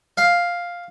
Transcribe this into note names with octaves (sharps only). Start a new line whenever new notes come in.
F5